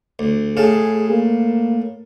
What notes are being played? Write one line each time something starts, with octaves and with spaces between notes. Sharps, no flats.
D2
A2 G#4 F5 A5
A#3